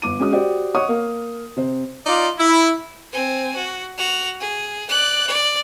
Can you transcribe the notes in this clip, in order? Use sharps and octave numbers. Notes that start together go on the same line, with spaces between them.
G1 D6 D#7
G#3 C#4 F#4 D#6
F#4 G4 C5 D5
C#5 D#5 F#5 C#6 D#6
A#3 F5
C3 C5
D#4 F4 D5
E4
C4 G#5
F#4
F#4 F7
G#4
D5 F#6
D5